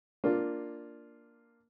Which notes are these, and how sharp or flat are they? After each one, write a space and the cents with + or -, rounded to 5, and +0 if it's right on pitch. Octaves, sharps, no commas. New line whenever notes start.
A#3 +0 D4 +0 F4 +0